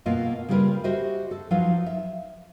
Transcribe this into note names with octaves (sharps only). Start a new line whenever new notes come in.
B2 A#3 B3 F4 A4 D#5
C#3 G3 F4 G4 A#4 B4
F#4 G4 C5 D#5 E5
A4
F3 F#3 D#4 F4 B4 F5
E5